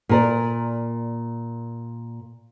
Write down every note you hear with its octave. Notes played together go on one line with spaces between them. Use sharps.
A#2 A#4 D5